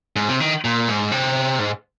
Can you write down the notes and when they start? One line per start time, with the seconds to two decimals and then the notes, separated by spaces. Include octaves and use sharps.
0.16 G#2
0.28 C3
0.40 D#3
0.64 A#2
0.88 G#2
1.12 C3
1.59 G#2